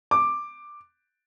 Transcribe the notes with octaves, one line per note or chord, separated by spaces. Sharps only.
D6